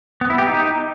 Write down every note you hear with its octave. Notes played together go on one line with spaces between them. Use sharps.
B3
E4
G4
D#4